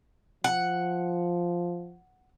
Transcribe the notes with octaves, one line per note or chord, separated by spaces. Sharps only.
F3 F#5